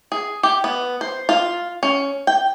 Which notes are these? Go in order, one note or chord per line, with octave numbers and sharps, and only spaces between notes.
G#4
G4
B3
C5
F4
C#4
G5